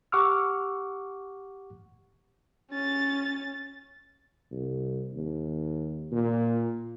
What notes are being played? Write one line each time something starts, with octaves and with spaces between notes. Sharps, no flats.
G4 F#5 C#6 D6 E6 F6
C#4 A6
C2
D#2
A#2